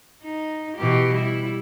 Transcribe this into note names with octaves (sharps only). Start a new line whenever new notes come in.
D#4
B2 E3 G4
G3 E4